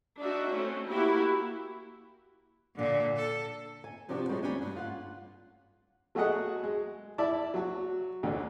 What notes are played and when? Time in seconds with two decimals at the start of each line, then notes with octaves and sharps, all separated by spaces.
0.20 D4 D#4 F#4 E5
0.52 A3 C4 C#4
0.88 A#3 E4 F#4 G4
2.75 A#2 D3
3.16 A4
3.84 G#5
4.09 C3 F3 C4 D4 F#4 G4
4.29 G3 G#3 C4 C#4 D#4 F#4
4.43 D2 G3 C#4 D4 G#5
4.62 G2
4.76 F4 F#5
6.15 F#3 A3 F#4 G#4 D#5 F#5
6.63 G#3
7.18 E4 D5 E5 A5 D6
7.54 F#3 F#4
8.23 A1 D2 D3